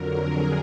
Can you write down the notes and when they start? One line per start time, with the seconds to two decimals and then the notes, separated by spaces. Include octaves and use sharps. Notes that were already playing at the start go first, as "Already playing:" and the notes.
Already playing: F2 D3 F#3 A#4
0.31 G#4